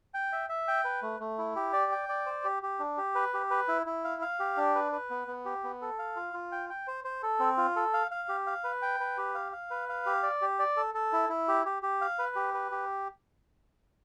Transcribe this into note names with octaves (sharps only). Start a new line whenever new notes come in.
G5
E5
E5
G5
B4
A3
A3
E4
G4
D5
G5
D5
C5
G4
G4
D4
G4
B4
G4
B4
E4
E4
F5
F5
G4
D4
B4
B4
B3
B3
G4
B3
A4
F5
F4
F4
G5
G5
C5
C5
A4
C4
F4
A4
F5
F5
G4
F5
B4
G5
B4
G4
F5
F5
B4
F5
G4
D5
G4
D5
A4
A4
E4
E4
G4
G4
G4
F5
B4
G4
B4
G4